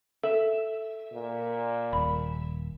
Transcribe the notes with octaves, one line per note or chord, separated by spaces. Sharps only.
A4 E5
A#2
D#1 B5